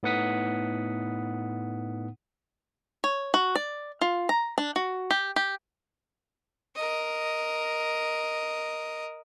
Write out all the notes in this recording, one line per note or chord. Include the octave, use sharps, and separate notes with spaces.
A2 B3 D#4 F#5 D#6 B6
C#5
F#4
D5
F4
A#5
D4
F#4
G4
G4
A#4 D#5